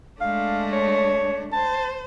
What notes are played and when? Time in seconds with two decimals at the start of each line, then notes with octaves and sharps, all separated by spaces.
0.21 G#3 A3 D4 F5
0.72 C#5
1.53 C5 A5